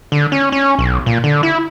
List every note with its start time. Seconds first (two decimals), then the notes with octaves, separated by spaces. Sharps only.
0.12 D3
0.32 C#4
0.52 C#4
0.79 B1
1.06 A#2
1.24 D3
1.43 E4